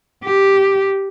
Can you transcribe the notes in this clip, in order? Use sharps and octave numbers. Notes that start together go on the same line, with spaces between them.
G4